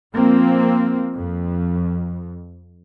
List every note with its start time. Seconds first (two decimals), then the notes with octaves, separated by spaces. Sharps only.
0.15 F3 A#3 C4
1.15 F2